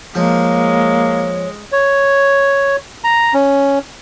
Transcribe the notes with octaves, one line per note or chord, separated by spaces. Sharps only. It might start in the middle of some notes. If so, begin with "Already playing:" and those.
F3 G#3 A#3 C#5
C#5
A#5
C#4